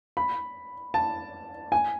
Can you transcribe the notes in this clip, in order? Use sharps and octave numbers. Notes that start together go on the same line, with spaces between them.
B5
A5
G#5